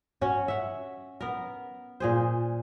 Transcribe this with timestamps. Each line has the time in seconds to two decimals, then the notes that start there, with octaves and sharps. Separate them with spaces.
0.21 C#4 F#4 C#5
0.48 E5 F#5
1.21 B3 A#4
2.00 A#2 G#4 C5